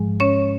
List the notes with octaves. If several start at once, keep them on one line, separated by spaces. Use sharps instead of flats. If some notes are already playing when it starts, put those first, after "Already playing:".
Already playing: G#2 F3 G#3
C#4 C#5